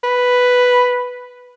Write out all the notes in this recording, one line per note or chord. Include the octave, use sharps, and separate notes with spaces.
B4